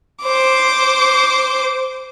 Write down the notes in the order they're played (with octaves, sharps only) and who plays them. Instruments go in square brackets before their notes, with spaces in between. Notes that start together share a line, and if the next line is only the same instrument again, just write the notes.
[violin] C5 D6